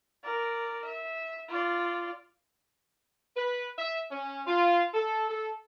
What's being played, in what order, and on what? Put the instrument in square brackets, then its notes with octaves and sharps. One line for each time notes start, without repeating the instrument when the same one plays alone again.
[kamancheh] A#4 D5
E5
F4 D5
[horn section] B4
E5
C#4
F4
A4
A4